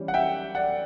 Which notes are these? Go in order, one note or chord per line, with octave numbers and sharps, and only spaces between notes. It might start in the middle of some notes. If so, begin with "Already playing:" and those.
Already playing: E3 G3 C#4
F#5
E5 G5
D5 F#5